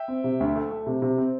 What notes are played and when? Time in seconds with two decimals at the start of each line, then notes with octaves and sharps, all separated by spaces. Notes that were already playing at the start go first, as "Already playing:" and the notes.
Already playing: E5 G5
0.08 C4
0.24 C3
0.40 D2
0.56 A3
0.71 A3
0.87 C3
1.02 C3
1.18 C4